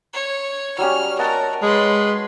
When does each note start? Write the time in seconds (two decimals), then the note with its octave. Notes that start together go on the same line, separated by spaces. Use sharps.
0.13 C#5
0.78 F#3 G3 C#4 F6
1.19 A#4 D#5 F#5 A5
1.62 G#3 B4 C6